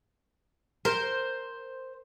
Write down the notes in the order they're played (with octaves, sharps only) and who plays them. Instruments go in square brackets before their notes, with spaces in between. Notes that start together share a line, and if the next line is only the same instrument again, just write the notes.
[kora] A#4 [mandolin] C5